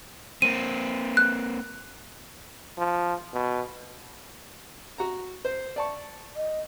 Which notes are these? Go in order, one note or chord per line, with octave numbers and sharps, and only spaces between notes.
A#3 C4 D#7
F#6
F3
B2
F#4 A#5
C5
D5 A5 C#6
D#5